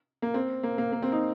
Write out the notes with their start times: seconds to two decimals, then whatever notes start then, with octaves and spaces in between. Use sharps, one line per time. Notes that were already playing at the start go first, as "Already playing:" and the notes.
0.22 A#3
0.34 C4
0.63 A#3
0.78 A#3
0.92 A#3
1.02 C4
1.12 D#4